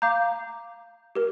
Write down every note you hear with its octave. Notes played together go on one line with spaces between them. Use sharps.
F5 A#5 D6 G6
G4 A#4